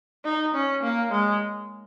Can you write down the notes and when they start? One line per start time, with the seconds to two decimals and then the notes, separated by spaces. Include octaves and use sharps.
0.25 D#4
0.54 C#4
0.83 A#3
1.11 G#3